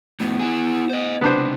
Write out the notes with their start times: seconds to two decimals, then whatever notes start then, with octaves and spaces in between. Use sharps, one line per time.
0.20 F2 A2 B3
0.39 E4 G#4
0.90 C5 D#5
1.21 C#2 C3 B3 D4 C5